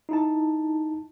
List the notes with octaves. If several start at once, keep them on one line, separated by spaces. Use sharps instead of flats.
D#4 E4 A5